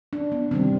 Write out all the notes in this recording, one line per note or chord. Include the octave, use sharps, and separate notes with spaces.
D4
B3
C3 D#3 G3 C4